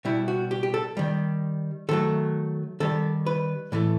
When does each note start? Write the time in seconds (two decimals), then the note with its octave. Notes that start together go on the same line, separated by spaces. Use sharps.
0.05 B2 G3 E4
0.28 F#4
0.51 G4
0.63 G4
0.74 A4
0.97 D#3 G3
1.89 D#3 F#3 A3 A4
2.80 D#3 G3 A4
3.26 B4
3.72 A2 E3 A3